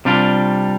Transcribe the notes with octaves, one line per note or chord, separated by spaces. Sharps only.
C3 G3 D4 F4